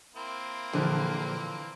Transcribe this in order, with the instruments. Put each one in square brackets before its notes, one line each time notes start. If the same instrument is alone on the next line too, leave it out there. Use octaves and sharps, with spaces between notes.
[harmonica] A#3 C4 E4
[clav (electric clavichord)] A#1 [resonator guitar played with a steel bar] D3 E3 F3